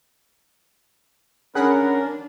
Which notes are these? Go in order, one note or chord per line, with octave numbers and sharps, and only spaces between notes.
C#4 D4 G#4 A#4 F#5 B5